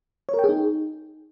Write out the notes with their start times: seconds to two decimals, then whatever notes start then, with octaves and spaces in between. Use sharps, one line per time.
0.29 C#5
0.34 A#4
0.39 G5
0.44 G#4
0.49 D#4